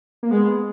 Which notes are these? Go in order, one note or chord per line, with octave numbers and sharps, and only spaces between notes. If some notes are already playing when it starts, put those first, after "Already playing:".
A#3
G#3 B3